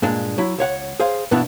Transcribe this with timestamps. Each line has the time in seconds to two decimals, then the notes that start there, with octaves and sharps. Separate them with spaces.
0.02 G2 A#2 G#3 D4
0.38 F#3 E4
0.58 C#2 C#5 F#5
1.00 G#4 C5 F5
1.31 G2 B2 E3 B3 D4 E4